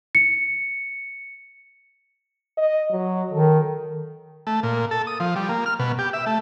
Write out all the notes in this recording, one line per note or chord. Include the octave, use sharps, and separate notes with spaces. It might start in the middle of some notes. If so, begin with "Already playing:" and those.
C#7
D#5
F#3
D#3 A4
A3
A#2
A4
D#6
F3
G3
A#3
F6
B2
G4
E5
A3